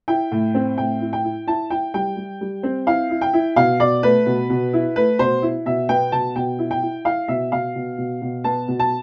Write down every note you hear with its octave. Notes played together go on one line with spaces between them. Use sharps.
E4 G5
A2
C4
A2 G5
E4
G5
E4
E4 A5
E4 G5
G3 G5
G3
G3
C4
E4 F5
E4
G5
E4
B2 F5
B2 D5
A3 B4
B2
B2
E4
A3 B4
B2 C5
E4
B2 E5
B3 G5
B2 A5
B2 G5
E4
G5
E4
E4 F5
B2 E5
B2 F5
B2
B2
B2
B3 A5
B2
A5